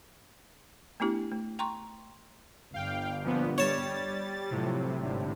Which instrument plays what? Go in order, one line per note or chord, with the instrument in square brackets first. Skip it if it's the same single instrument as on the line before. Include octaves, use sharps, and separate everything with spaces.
[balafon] A3 B3 D4 E4 G4
A3
G5 A#5 C6 C#6
[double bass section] G1 [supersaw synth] F5 G5
[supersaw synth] A#2 F3 B3
[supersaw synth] G3 A6 [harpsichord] C#5 A5
[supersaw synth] A2 C3 [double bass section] F3 F#3
[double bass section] G#1 D3